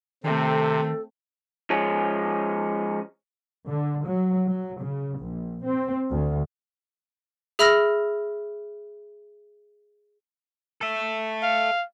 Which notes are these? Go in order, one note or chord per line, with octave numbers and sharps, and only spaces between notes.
C3 D#3 A3 C4 A4
F3 G#3 C#4
D3
F#3
F#3
C#3
A#1
C4
D2
G#4 E5 B5 E6 F6 A#6
A4 E5
F5